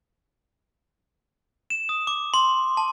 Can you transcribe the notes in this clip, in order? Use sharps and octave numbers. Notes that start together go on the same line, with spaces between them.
E7
D#6
D6
C6
A5